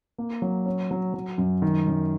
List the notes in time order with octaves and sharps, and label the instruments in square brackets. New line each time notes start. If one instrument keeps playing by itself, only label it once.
[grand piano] A#3
F#3
C#4
F#3
F#3
F#2
D#3
F#2